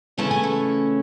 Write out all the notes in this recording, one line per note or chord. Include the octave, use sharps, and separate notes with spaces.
C#3 E3 A3 C#4 E4 A5
G#5
A4